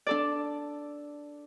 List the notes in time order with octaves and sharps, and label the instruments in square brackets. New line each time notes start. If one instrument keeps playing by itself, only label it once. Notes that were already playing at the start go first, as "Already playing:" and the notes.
[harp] D4 A4 D5